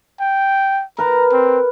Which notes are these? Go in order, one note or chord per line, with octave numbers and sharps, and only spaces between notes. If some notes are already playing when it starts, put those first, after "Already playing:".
G5
A#4 B4 A#5
C4